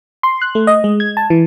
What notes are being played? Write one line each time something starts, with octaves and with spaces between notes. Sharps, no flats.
C6
F#6
A3
D#5
G#3
G#6
A5
E3